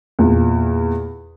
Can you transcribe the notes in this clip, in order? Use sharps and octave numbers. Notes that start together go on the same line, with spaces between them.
E2 A#2